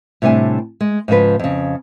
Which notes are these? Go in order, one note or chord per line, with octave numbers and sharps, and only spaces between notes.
A2 C3 G3 D4 G#5 A5
G#3
G#2 C#3 F3 B4
F2 C#3